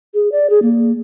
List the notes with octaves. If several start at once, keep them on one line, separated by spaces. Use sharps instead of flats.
G#4
D5
G#4
A#3